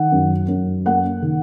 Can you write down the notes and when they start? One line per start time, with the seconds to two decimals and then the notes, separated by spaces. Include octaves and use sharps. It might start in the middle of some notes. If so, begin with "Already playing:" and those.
Already playing: D#3 F#5
0.12 F#2
0.48 F#2
0.86 A#3 F#5
1.22 D#3